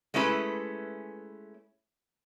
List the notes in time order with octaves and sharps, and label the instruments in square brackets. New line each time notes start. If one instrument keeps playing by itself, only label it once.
[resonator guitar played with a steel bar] G#3 A3 C#4 E4 B4